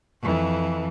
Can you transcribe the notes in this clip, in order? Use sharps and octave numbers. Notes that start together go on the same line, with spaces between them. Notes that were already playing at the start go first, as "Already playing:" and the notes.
F2 E3